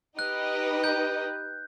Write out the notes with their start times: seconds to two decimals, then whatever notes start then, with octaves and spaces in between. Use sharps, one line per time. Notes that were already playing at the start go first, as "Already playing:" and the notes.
0.18 D#4 G4 B4 D#5 F#6
0.84 G6